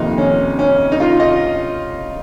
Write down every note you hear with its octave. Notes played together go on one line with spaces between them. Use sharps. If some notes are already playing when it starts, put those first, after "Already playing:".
Already playing: F2 C3 D#3 A#3 D#4
C#4
C#4
D#4
F4
D#5